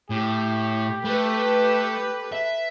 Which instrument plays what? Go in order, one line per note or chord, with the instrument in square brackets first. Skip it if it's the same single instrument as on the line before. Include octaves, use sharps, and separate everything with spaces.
[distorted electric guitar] A2 [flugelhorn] G4
[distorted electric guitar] A3 [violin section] A4 B4
[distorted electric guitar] E5